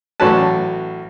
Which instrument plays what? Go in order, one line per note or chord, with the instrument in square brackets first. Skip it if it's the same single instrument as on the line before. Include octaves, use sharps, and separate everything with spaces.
[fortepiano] A1 F#3 C#4 F#4 B4 A5